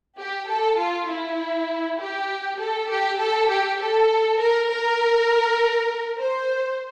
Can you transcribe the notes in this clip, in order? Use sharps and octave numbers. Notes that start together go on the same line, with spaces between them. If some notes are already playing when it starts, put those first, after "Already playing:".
G4
A4
F4
E4
G4
A4
G4
A4
G4
A4
A#4
A#4
C5